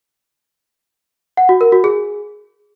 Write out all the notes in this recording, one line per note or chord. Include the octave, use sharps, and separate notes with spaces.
F#5
F#4
A#4
F#4
G#4